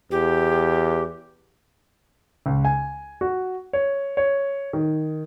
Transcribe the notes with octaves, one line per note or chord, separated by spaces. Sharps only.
E2 G4
C#2
G#5
F#4
C#5
C#5
D#3